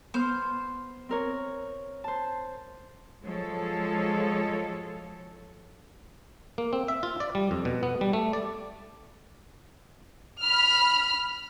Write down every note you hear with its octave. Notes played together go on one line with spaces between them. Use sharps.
B3 C5 F6
C4 A#4 C#5
C5 A5
F3 F#3 G#3 A4 C#5
A#3
C4
E5
F4
D5
G3
F2
B2
B3
G3
A3
D5
B5 F6